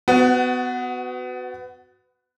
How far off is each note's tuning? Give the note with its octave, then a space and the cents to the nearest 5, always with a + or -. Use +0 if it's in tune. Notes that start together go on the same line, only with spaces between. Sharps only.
B3 +25 F#4 +0